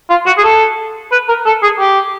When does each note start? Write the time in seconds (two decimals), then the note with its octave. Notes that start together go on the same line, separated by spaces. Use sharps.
0.10 F4
0.26 F#4
0.38 G#4
0.44 A4
1.12 B4
1.29 A#4
1.46 A4
1.63 G#4
1.79 G4